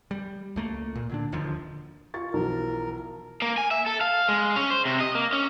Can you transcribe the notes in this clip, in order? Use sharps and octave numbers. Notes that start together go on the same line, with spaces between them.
G3
C#2 A3 A#3
A#2
A#2 D3 D4
D1 D#2 D3 F3
F4 C#6 A6
B1 E3 F3 A#4
A#3
G#5
E5
A4
F5
G#3
C#4
C5
C3
D#5
A#3
C#4